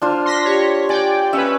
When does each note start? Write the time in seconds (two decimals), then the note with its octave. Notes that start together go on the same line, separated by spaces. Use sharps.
0.02 D4 F4 C5 F6
0.25 C6 A#6 B6
0.45 G4 C#5
0.89 D5 G5 G#5
1.33 C#4 B4 E5